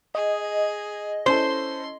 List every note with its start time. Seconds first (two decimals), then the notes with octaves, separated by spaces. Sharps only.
0.15 G#4 D#5
1.26 C#4 E4 A4 C5 C6